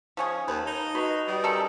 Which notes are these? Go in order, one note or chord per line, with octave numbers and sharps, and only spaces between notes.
F3 C#4 G#4
D#2 B4 A5
D#4
F#4 B4 D#5 B5
G3 D#6
C#4 A4 A#4